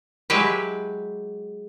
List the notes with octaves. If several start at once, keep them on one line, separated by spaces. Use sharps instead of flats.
F#3 G#3 E4 G4 B4